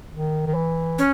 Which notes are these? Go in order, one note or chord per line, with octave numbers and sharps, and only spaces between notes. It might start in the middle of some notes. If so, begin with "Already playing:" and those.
D#3
D#3
E3
C#4